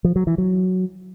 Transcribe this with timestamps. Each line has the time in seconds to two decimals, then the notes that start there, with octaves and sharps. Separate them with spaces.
0.04 F3
0.16 F#3
0.27 E3
0.38 F#3